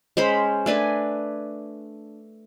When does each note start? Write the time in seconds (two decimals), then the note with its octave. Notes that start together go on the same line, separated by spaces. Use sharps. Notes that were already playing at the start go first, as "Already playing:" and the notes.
0.17 G#3 C#4 C5 B5
0.66 A3 D4 B4 G#5